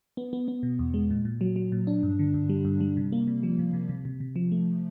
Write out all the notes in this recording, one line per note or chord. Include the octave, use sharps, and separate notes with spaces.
B3
B3
B3
B2
E2
G#3
A#2
A#2
F#3
F#3
A#2
D4
G2
D3
G2
G3
G2
G3
C3
A#3
C3
F3
C3
C3
C3
C3
C3
F3
A3